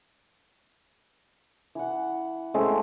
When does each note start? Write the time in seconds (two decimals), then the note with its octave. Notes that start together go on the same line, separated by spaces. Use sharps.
1.75 E3 F#5
2.54 G#3 A3 C4 C#4